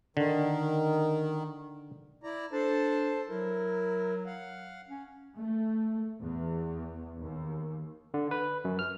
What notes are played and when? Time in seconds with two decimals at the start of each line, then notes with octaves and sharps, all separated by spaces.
0.17 D3 D#3
2.23 E4 D5 A#5
2.52 D4 A4 C5 A5
3.28 F#3 E4 A#4
4.26 F5 F#5
4.88 C#4
5.37 A3
6.20 E2
7.20 D#2
8.14 D3
8.31 B4
8.65 F#2
8.79 F6